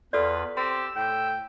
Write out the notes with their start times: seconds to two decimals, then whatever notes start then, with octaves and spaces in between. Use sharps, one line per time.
0.13 E2 F4 A4 B4 D5
0.57 C4 G4 E6
0.96 A2 G5